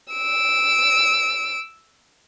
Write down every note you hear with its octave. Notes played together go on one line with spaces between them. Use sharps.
E6 D7